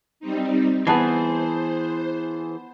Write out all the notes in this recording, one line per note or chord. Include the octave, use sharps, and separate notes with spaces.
G3 C4 D#4
E3 B3 G#4 C5 A5 C7